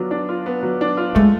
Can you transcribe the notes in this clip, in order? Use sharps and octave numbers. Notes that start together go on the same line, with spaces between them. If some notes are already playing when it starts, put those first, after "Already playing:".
Already playing: F#3 B3 D4 F4
D4
F4
B3
F#3
D4
F4
G#3 A3